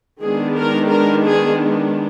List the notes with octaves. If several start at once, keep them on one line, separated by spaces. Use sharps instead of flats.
D#3 G#3 B3 D4 G#4
A#4
A#4
G#4